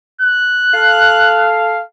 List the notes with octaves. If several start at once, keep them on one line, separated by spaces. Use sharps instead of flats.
F#6
A4 F5